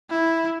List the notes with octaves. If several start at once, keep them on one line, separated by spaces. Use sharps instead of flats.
E4